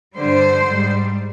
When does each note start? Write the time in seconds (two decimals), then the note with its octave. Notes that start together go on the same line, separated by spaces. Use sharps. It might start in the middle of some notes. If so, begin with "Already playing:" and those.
0.16 G2 D3 G3 C5
0.66 G#2 G3